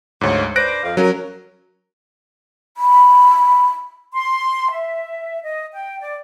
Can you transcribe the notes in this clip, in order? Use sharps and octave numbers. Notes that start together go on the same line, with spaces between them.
D2 G#2 F3 C#5
D4 B4 C5 F#6 A#6 D7
F2 F5
F#3 C#4 A#4
B5
C6
E5
D#5
G5
D5